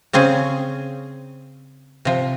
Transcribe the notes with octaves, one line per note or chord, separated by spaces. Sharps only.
C#3 C4 C#4 G#4
C3 F3